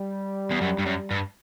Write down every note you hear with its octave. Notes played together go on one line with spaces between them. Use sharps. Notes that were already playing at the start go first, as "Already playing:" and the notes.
Already playing: G3
E2
F#2
G2
F#2
G2